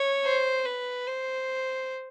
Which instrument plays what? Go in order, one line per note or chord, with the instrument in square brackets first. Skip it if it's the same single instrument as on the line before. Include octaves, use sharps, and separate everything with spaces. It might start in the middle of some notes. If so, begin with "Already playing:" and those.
Already playing: [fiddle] C#5
C5
B4
C5